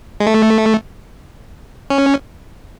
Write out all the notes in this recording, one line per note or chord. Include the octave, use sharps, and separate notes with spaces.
G#3
A3
C#4